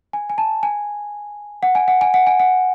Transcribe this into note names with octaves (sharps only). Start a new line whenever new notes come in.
G#5
G#5
A5
G#5
F#5
G#5
F#5
G#5
F#5
G#5
F#5